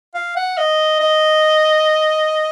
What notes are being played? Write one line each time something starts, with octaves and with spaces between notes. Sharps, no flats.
F5
F#5
D#5
D#5